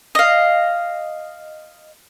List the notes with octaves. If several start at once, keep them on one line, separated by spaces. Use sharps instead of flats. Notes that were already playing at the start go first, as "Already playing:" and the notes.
D#5 F5